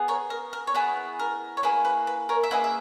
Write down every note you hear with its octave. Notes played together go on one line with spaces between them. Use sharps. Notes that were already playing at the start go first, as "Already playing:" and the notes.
Already playing: B3 G#4
A#4 C#5
A#4
A#4
C#5
B3 E4 G#4 B4
A#4
C#5
A#3 E4 G#4 B4
B4
B4
A#4 C#5
E5
A#3 E4 G#4 B4 D#5
E5